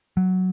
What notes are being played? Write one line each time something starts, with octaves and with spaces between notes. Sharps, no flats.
F#3